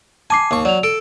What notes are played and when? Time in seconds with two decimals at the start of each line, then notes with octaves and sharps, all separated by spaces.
0.30 G#5 A5 D6 C7
0.51 D#2 C#6
0.65 F#3 D5 F7
0.83 A4 D7